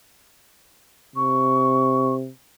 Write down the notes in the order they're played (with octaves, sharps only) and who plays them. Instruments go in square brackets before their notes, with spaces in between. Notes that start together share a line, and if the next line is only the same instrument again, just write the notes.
[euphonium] C3 [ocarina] C#6